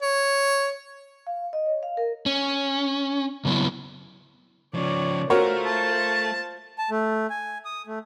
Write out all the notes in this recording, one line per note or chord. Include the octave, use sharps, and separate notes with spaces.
C#5
F5
D#5
C#5
F5
A#4
C#4
C#3 F#3 B3 E4
C#3 F3 C#5 D5
A3 F4 F#4 A#4 C5 C#5
A5
A5
A3
G#5
D#6
A3